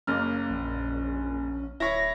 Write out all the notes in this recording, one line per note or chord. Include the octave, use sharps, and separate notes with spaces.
F#1 A#3 C#4 F6
A#1
D1 E4 C#5 A#6